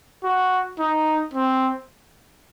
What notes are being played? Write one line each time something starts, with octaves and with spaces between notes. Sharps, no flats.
F#4
D#4
C4